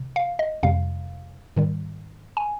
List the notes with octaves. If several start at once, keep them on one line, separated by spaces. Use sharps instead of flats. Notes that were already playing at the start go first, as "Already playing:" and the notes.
Already playing: C3
F5
D#5
F2 C3 G3 F5
G#2 D#3 G3
G#5